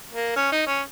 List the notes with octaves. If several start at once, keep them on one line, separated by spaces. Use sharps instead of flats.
A#3
C#4
D#4
C#4